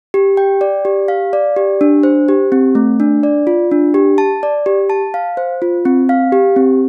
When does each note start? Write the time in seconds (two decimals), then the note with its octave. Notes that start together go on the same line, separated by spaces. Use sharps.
0.14 G4
0.37 G5
0.61 D5
0.85 G4
1.08 F5
1.33 D5
1.56 G4
1.81 D4
2.03 C5
2.28 G4
2.52 C4
2.75 A3
3.00 D4
3.23 D5
3.47 F4
3.71 D4
3.94 G4
4.18 A5
4.43 D5
4.66 G4
4.90 A5
5.14 F5
5.37 C5
5.62 F4
5.85 C4
6.09 F5
6.32 G4
6.56 C4